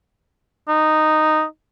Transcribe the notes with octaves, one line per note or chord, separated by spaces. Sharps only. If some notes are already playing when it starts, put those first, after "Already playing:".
D#4